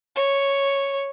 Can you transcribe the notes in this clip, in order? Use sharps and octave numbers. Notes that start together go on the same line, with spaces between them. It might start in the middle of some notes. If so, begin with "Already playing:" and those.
C#5